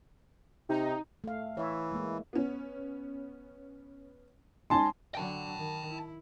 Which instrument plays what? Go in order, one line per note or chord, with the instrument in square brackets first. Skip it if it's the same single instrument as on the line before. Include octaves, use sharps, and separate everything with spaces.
[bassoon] C3 [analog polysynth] D#4
[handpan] A3 F5
[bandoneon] E3 [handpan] C#5 E5
[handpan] G#3 A#3 E4
[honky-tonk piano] B3 C#4
[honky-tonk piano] G#3 C#4 D#4 [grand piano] G#5 A5 C6
[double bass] D3 F#3 [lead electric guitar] G5 A5
[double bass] D#3
E4